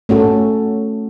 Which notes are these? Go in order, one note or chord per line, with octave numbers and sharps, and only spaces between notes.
A3 C#4 F#4 A4